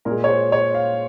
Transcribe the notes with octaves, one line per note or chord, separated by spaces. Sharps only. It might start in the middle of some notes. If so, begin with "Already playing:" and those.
A#2 G#3 A#4
C#5
C5
C#5
F5